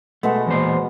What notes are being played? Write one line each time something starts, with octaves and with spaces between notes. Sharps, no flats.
B2 G#3 A3 F#5
E2 A#2 C5